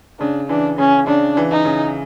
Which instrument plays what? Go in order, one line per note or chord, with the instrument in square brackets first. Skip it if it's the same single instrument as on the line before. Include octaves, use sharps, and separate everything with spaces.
[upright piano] C#3 [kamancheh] D4
[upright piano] E3 [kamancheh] D4
[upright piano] C#3 [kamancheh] C#4
[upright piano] C#3 [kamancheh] D4
[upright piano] E3
[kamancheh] D#4
[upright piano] C#3